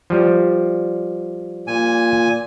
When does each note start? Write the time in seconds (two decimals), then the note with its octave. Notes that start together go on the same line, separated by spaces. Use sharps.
0.10 F3 G3
1.67 A#2 G#5